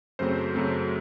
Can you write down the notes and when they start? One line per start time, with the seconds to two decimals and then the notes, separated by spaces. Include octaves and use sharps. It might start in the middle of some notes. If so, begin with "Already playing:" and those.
0.19 F#2 C#3 F#3 A3 C4 C5
0.55 F#2 C#3 F#3 A3 C4